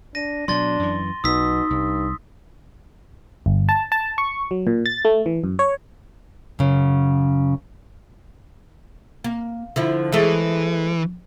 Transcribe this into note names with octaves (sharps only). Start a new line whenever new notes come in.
D4 A#6 D#7
B2 F#3 D4 C6 A6 G7
F#2 E3
B1 B2 D#4 D#6 E6 B6
C2 G2
G1
A5
A5
C#6
F#3
A#2
A6
A3
E3
F#2
C#5
F#2 C#3
A#3
D3 F3 E4
E3 G#3 A3